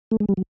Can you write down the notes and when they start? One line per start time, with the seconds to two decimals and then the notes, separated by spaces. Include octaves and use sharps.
0.11 A3
0.20 G#3
0.29 G3
0.37 F#3